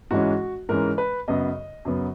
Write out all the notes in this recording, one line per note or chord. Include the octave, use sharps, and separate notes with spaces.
G#2 E3 G#3 C#4 F#4
G#2 E3 G#3 C#4 A#4
B4
F#2 C#3 F#3 B3 D#5
F#2 C#3 F#3 B3